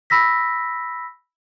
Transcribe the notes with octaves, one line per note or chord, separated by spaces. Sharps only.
B5 E6 A#6 B6